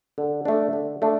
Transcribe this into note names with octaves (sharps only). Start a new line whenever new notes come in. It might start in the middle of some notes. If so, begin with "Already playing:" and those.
D3
A3 D4
D3
A3 D4